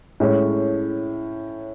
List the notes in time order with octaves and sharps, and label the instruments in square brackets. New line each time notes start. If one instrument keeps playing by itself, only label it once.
[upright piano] A2 G#3 C#4